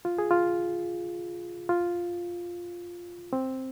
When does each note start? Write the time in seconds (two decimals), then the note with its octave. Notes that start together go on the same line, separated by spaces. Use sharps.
0.05 F4
0.18 G#4
0.31 F4
1.69 F4
3.33 C4